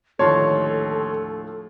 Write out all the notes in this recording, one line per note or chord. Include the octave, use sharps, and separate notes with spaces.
D#2 A2 D3 F3 A4 C#5 A5 C6